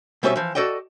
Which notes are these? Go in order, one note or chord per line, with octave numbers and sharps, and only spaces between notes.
B2 G3 C4 C#4 D5 E5
E3 F3
F#4 A4 D5 D#5 G5